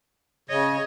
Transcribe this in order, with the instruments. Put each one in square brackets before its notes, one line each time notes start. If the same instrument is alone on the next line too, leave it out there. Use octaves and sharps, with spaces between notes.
[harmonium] C#3 [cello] C#5 D#5